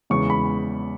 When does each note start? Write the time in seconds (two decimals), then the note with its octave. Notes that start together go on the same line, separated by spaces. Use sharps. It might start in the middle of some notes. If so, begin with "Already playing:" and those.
0.10 E2 C#3 G#3 C#6
0.30 B5